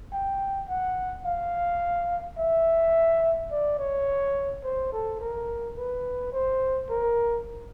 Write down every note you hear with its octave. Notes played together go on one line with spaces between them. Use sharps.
G5
F#5
F5
E5
D5
C#5
C5
A4
A#4
B4
C5
A#4